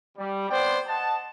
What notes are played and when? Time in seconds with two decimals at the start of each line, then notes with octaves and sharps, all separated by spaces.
0.18 G3
0.49 B3 C4 C5 D5 G5
0.87 D#5 F#5 A5